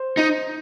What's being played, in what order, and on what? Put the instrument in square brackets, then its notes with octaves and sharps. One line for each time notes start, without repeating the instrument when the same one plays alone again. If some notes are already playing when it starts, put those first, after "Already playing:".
Already playing: [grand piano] C5
[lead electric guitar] D#4